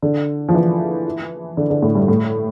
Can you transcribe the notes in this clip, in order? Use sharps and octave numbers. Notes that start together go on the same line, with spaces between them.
D3
F3
E3
D3
D3
A2
G2
A2